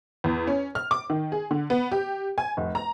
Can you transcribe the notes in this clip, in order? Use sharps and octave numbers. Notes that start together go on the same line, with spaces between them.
E2
C#4
F6
D6
D#3
G#4
D3
B3
G4
G#5
F1
A#5